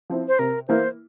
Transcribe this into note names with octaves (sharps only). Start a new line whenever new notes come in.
F3 C4 E4
C5
C3 A#4
E3 A#3 E4 C5